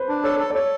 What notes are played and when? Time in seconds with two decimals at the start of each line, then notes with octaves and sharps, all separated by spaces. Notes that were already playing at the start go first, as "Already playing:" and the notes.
Already playing: B4 C5
0.09 D4
0.24 A4 C#5
0.39 A4
0.50 D5
0.55 A4 C#5